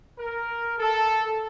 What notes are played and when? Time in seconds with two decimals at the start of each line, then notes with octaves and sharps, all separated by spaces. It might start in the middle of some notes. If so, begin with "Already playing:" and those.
0.18 A#4
0.78 A4